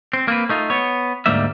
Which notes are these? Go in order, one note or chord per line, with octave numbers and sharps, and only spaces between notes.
C4
A#3 C4 B4
A3 D#4 F4
B3 C#5
D2 G#2 G3 A#3 E5